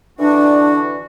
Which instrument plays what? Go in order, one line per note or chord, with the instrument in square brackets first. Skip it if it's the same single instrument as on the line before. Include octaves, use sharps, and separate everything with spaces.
[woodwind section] D3 E3 F#4 [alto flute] D4